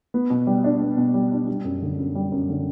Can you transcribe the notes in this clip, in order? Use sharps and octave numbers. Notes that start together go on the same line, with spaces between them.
B3
B2
G3
D4
B3
B2
G3
D4
G3
F#2
D3
F#2
G3
F#2
D3